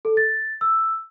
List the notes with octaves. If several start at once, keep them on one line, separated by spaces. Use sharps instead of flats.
A4
A6
E6